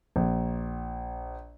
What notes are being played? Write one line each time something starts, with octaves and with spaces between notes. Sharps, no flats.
A#1